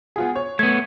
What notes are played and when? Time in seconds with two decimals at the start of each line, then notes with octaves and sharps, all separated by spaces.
0.16 B3 F4 G#4
0.35 C#5
0.59 A3 B3 G#6